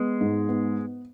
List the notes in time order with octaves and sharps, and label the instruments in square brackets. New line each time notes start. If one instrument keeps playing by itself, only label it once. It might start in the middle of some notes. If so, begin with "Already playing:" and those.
Already playing: [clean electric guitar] G#3 [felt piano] B3
[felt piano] G#2
B3